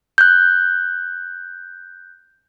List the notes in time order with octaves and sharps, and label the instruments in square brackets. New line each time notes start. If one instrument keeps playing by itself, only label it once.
[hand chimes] F#6 G6